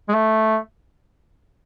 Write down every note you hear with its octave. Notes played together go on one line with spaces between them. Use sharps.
G#3
A3